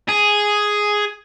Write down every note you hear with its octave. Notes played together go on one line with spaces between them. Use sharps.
G#4